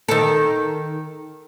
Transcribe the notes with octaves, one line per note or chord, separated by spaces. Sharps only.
D#3 A4